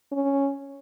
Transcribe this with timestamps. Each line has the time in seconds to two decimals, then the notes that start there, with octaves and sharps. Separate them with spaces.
0.12 C#4